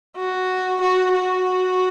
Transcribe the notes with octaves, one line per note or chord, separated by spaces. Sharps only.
F#4
F#4
F#4